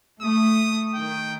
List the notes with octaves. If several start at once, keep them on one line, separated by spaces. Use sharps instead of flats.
A3 D#6
D#3 G5